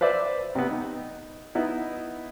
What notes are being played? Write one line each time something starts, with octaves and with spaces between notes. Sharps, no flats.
B4 C5 D5 E5
C3 B3
D#4
B3 D#4 E4